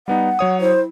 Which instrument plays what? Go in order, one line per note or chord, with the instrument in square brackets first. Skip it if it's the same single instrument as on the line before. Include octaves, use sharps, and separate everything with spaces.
[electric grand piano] G3 B3 D#4 [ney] F#5
[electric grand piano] F#3 C#5 D#6
[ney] E4 [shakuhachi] C5